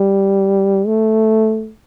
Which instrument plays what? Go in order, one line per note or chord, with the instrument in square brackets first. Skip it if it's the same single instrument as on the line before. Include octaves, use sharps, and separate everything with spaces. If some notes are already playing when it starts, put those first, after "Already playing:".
Already playing: [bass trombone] G3
A3